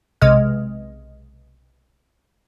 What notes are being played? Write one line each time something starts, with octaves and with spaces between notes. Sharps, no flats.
B1 C3 G#3 D#5 F6